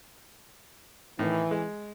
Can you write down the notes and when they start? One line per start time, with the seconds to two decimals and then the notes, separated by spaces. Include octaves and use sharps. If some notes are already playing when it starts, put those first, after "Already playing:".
1.19 A2 D#3 E3
1.51 G#3